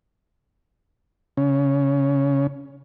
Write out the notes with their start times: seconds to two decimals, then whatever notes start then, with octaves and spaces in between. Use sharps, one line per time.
1.37 C#3 C#4